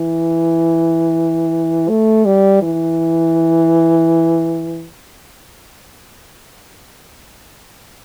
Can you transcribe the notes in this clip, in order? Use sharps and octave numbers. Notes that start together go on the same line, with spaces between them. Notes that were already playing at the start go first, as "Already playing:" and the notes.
Already playing: E3
A3
G3
E3